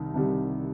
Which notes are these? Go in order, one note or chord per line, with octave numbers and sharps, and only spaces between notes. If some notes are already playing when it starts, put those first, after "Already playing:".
Already playing: C2 C3 D#3 G3
C2 C3 D#3 G3